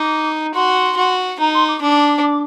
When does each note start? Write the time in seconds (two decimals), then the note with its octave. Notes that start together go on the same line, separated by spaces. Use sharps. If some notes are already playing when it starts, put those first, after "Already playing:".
Already playing: D#4 D6
0.54 F#4 C6
0.96 F#4
1.40 D#4 A#5
1.54 C6
1.68 D6
1.82 D4 D6